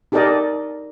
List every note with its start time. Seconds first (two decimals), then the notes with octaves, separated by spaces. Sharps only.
0.12 D#4 G4 A4 A#4 D5 D#5